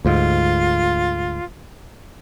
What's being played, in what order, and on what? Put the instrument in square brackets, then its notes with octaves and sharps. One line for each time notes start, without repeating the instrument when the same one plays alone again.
[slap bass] D2 G#2 [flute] F4